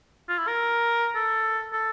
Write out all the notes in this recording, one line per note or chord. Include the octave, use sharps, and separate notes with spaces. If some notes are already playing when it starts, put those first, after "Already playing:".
F4
E4
A#4
A4
A4